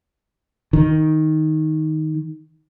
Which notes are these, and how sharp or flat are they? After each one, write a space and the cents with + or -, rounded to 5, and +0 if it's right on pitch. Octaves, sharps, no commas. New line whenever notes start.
D#3 +5